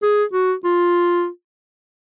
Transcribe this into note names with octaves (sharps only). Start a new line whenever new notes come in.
G#4
F#4
F4